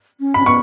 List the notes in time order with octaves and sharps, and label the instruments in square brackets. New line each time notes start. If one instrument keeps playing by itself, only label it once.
[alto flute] C#4
[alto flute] C#4 [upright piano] B5
[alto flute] B3 [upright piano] C#6